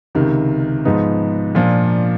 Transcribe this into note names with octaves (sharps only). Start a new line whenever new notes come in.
C#2 C3 D#3
G#2 F3 G#3 B3 D#4
A#2 F3 A#3 D4